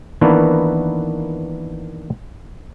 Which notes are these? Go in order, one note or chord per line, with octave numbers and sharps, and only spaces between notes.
D#3 E3 A#3 B3 D4